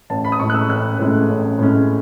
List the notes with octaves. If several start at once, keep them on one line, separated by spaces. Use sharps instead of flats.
A1 A5
B5
D#6
A2 G#3 C#4 C#6
F#6
E6
A1 F#6
A2 G#3 C#4
A1
A2 G#3 C#4